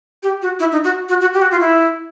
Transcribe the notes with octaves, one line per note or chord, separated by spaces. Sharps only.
G4
F#4
E4
D#4
F#4
F#4
F#4
G4
F#4
F4
E4